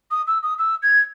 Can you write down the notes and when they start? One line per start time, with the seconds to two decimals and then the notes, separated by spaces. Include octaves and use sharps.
0.11 D#6
0.27 E6
0.43 D#6
0.58 E6
0.82 G#6